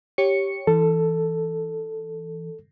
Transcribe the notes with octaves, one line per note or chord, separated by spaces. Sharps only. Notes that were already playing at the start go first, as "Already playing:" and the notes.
G4 C#5 C#7
E3 A4